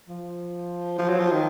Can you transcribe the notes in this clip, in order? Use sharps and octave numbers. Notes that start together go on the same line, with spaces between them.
F3
F3
F#3
F3
D#3